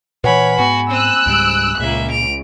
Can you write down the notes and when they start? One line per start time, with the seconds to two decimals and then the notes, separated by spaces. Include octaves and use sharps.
0.24 A#2 E3 B4 C#5 F#5 G#5 B5
0.59 G#2 B3 F#4 G#5 B5
0.91 C4 E6 F#6 D#7
1.26 C#2 G#2 G3 D7
1.80 C#2 A#2 A#3 E5
2.11 D7 F7